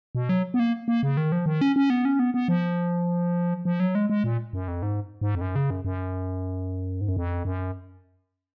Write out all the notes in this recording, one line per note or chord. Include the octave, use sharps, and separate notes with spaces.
B2
F#3
B3
A#3
A#3
C#3
D#3
F3
D#3
C#4
C#4
B3
C#4
B3
B3
F3
F3
F#3
G#3
G#3
A#2
F#2
F2
G#2
G#2
F2
F#2
C#3
F#2
F#2
G#2
F#2
F2
F#2